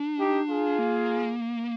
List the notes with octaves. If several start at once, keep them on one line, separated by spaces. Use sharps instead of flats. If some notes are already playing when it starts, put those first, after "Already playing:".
Already playing: D4
D#4 G4
F4 G#4
A#3